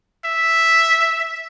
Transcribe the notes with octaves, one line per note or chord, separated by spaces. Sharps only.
E5